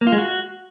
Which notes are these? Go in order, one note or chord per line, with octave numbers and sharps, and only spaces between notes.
A#3
F4
G#3
F#4